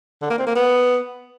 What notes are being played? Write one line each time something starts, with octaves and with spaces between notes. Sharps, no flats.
D3
A#3
C4
A#3
B3